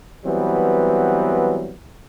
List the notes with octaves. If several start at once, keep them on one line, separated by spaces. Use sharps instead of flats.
E3 F#3 G3 B3 C4